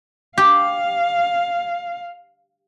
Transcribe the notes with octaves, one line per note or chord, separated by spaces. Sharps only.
G4 F5